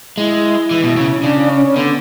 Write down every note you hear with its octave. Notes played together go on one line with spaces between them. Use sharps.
G#3 E4
E3
B2
C#3
C#4
C#3 D4
C#4
C#4
D3 B3